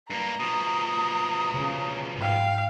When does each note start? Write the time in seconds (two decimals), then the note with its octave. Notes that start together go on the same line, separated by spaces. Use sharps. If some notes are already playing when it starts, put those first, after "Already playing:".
0.10 G2 A#3 A#5
0.40 B2 F3 D#6
1.53 C#3
2.21 G#2 F5 G5